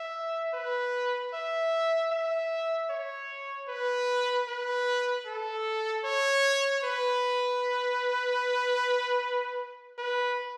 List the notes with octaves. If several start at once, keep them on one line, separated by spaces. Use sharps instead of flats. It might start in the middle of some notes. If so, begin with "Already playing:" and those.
Already playing: E5
B4
E5
E5
C#5
B4
B4
A4
C#5
B4
B4